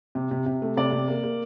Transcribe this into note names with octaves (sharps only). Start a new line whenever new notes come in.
C3
C3
C3
A3
C3 D5
C3
A#3
A#3